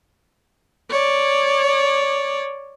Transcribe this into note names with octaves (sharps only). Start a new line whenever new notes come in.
C#5 D5